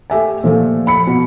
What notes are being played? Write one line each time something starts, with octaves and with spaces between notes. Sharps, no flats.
A3 G4 E5 G#5
A#2 F3 A3
B5 C#7
B2